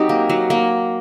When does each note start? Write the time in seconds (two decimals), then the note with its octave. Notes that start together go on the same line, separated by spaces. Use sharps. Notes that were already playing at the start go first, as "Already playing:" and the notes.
Already playing: F#3 C4 D#4 G4
0.09 A#3
0.30 F#3
0.50 A#3